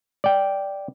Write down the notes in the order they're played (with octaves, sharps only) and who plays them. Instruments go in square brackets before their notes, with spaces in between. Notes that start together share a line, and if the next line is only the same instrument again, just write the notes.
[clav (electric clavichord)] D5 G5